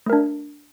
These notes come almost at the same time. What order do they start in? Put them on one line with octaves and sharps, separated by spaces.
A3 A#4 D4